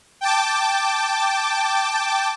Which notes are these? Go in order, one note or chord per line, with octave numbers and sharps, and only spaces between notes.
G5 A5 D6